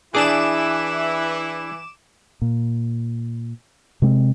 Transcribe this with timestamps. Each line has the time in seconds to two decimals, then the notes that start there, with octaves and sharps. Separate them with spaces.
0.15 E3 D4 E4 G#4 D6 E7
2.42 A#2
4.02 C3 G#3 A#3 C4